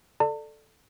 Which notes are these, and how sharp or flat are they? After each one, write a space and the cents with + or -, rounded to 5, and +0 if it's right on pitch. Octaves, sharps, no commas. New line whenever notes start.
A4 +0 D5 +20 A5 +40